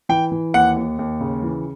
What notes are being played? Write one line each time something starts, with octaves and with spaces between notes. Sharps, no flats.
E3 G5
E3
D#2 F#5
D#2
D#2
C#3
E3